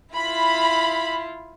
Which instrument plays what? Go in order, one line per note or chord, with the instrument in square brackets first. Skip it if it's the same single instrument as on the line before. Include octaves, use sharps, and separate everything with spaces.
[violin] E4 F4 [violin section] B5